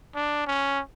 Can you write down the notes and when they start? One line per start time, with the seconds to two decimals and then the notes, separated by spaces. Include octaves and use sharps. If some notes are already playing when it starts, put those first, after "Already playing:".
0.15 D4
0.47 C#4